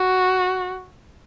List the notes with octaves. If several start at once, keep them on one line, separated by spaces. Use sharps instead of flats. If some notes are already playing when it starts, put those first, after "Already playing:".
Already playing: F#4